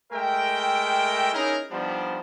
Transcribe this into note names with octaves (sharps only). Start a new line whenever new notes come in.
G#3 A3 A#4 E5 G5
C#4 D#4 E4 G#4 A#4
F3 G3 B3 D4 D#4 C5